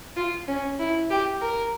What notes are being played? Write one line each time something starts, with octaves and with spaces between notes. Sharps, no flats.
F4
C#4
E4
G4
A#4